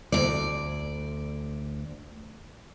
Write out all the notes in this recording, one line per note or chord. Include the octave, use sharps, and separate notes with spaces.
D2 C3 D5